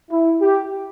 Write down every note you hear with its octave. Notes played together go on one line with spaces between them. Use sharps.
E4
G4